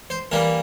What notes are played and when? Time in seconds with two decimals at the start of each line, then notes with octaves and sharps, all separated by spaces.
0.10 C5
0.32 E3 G3 A#3 A#4